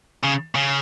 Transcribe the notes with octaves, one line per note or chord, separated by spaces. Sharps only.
C#3
C#3